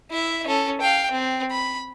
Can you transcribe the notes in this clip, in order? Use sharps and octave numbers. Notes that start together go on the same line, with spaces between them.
E4 E5
C#4 A4
F5 G5
C4
B5